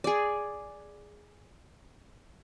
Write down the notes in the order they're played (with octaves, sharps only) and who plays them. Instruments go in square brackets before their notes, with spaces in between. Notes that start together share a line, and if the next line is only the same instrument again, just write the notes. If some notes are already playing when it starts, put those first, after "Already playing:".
[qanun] G#4 D5